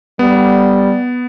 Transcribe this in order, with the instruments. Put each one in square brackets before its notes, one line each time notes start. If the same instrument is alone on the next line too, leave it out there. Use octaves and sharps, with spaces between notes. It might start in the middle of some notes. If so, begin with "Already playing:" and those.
[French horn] G3 [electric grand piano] B3